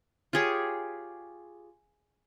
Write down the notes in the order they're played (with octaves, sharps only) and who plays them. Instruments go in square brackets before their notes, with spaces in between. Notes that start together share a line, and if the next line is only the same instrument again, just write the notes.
[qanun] F4 G4 G#4 C#5